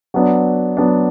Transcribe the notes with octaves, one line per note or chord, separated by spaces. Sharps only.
F#3 B3 D4
F#3 B3 D4